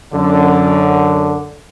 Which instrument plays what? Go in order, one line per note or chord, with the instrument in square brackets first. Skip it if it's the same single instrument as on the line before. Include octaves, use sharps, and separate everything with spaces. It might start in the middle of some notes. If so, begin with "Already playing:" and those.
[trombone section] F#2 D3